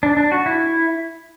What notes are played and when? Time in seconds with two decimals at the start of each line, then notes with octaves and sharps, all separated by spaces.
0.03 D4
0.17 D4
0.32 F#4
0.46 E4